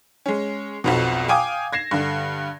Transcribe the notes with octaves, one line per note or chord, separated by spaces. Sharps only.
G#3 C#4
B1 F2 B2
F5 G5 G#5 D6 D#6
G#6 A#6 C7 E7
G2 D3